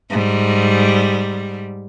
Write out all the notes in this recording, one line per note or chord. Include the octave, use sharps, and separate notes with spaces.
G#2 G3